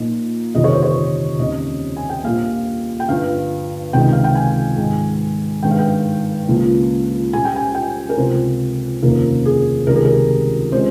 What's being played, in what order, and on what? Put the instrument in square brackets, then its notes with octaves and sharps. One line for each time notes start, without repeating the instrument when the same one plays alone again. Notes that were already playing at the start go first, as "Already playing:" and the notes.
Already playing: [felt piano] A#2 F3 A#3 D#4
G1 F2 C3 D#3 G3 D#5
C#5
C5
C#5
D#2 C#3 G3 C4 D#5
G#5
G5
A#1 A#2 G3 A#3 F5
G5
G1 G2 F3 F5
C#2 C3 D#3 G#3 D#4 G5
F5
G5
G#5
G#2 D#3 G#3
G#1 G2 D#3 G#3 G5
F5
G5
C#2 C#3 F3 A#3 F4
A#2 G3 C#4 G#5
G5
G#5
G5
A#4
C#2 C3 F3 C4 F4 C5
F1 D#2 C#3 F3 A#3 A#4
G#4
C#2 C3 D#3 G3 A#4
G#4
A#4
C#3 G#3 C4 F4 C5